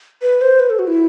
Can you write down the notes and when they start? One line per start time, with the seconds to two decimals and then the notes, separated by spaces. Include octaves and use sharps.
0.22 B4
0.41 C5
0.60 B4
0.70 A4
0.79 F#4
0.87 E4